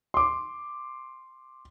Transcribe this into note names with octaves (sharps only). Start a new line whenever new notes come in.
C6 D6